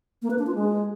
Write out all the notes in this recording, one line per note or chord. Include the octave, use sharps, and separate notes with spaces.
A#3
B4
D4
F4
G#3